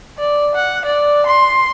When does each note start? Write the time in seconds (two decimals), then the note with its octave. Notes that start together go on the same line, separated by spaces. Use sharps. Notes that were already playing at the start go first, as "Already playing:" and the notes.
0.19 D5
0.55 F#5
0.85 D5
1.26 C6